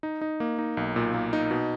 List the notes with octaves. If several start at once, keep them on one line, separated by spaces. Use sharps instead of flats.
D#4
D#4
A#3
D#4
B1
A#2
A#3
D#4
B2